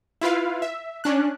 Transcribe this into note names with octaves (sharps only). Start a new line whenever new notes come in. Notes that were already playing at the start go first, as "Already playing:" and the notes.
E4 F4 B4 F5
E5
C#4 D4 F#6